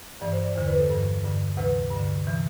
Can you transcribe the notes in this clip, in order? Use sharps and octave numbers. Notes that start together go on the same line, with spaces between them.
G2 E3 D5
C5
D5
E2 D3 C5
B4
A4
G2 E3 A4
G2 D3
D2 C3 E3 B4
G2
D3
C3 E3